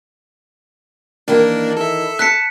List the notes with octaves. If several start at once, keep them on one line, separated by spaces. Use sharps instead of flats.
D#3 E3 A#3 D4 A#4
A4 E5
A5 F#6 B6 C#7